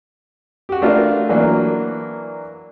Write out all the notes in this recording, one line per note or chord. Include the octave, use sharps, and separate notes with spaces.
F#4 G4
A3 D4 F4 A#4 B4
E3 F#3 A#3 D4